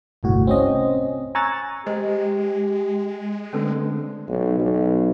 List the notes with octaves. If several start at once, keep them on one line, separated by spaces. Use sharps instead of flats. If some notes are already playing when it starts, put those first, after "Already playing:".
G1 C2 A2 F#4
C4 C#4 D#5
G#5 A#5 C#6 E6 F#6 A6
G#3 G4 C5 D#5
D3 A3 C4 C#4 A4 B4
B1
B1